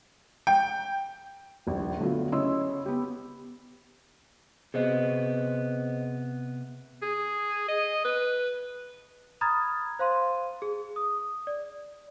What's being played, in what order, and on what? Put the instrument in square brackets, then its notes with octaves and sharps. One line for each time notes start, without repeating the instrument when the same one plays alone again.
[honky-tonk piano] G5
[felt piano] D#1 A#1
D3 F#3 A3 B3 F4
C#3 E4 C#5 D#5 C6 E6
B3 G4
[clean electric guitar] C3 B3 [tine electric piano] G#4 C5 D#5
[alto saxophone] G#4
D#5
B4
[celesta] A#5 B5 D#6 F6 G#6 A6
C5 F5 C6 D#7
G#4
D#6
D5